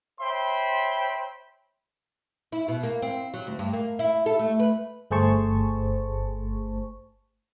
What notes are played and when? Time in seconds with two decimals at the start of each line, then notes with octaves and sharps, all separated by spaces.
0.20 C5 C#5 E5 G5 B5 C6
2.52 E4
2.68 B2
2.83 A#3
3.02 C4
3.34 F#3
3.47 D2
3.59 G2
3.73 A#3
3.99 E4
4.26 A4
4.39 A3
4.60 B4
5.11 G1 A3 G#4 C5 A5 C#6